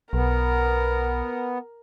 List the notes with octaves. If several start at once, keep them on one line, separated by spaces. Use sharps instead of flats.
B1 B3 A#4